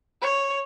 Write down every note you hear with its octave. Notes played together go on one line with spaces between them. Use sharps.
C#5